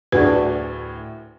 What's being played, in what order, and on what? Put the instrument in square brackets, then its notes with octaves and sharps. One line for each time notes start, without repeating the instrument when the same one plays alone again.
[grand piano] D2 A2 [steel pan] D4 F#4 G#4 [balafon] B4